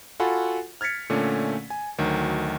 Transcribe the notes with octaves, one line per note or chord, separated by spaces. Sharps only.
F4 F#4 A4 F#5 G#5 B5
F6 G#6 A6 B6 C#7
A#2 D3 A3 C#4
G#5
D2 D#3 F#3